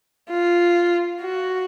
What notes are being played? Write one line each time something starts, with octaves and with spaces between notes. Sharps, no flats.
F4
F#4